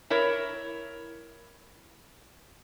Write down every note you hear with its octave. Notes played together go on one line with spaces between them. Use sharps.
E4 A#4 C#5